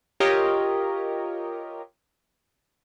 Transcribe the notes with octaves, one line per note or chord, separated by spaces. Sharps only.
F4 G4 A#4 C#5 D#5